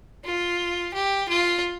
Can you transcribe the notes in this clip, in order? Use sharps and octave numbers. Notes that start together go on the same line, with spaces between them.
F4
G4
F4